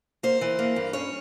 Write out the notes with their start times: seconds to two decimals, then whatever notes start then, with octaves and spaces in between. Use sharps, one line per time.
0.23 A#3 C5
0.41 E3
0.59 A#3
0.76 G2
0.93 C#4 C#5